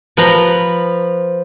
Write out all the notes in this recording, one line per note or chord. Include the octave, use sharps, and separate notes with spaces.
F3 B4 A#5